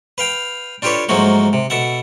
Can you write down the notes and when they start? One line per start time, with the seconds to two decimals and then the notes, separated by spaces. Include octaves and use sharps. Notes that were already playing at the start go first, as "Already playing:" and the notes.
0.18 B4 F5 G5
0.82 D4 F4 G4 A4 B4 C#5
1.09 G#2 F3 F#3 A3 A#3 F#4
1.53 C3
1.70 B2 A4 E5 F#5